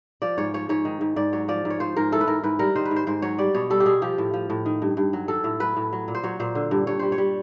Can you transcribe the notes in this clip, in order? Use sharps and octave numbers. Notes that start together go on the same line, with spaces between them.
F3 D5
G#2 C#5
F3 C#5
G#2 C#5
D#3
G#2
G#2 D5
F#3 C#5
F3 D5
G#2
C#5
F3 C5
G#2 A#4
E3 A4
B4
G#2 A#4
G#2 B4
G3 A#4
D#3 C5
B4
G#2
C5
G#2 C5
F#3 C#5
G3 D5
B2 C#5
G3 A4
G4
B2 G#4
F3 G4
A2
F3
A2
D#3
G2
G2
F#3
F#3 A4
A2
F#3 B4
A2
F#3
A#2
C5
F#3 C#5
A#2 C5
D3
G2
G2 C#5
G3 C5
C#5
G3